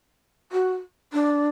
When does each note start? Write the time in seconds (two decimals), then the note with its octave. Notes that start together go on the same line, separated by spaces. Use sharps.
0.52 F#4
1.13 D4